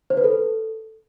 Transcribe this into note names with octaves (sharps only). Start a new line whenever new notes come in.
C5
B4
A4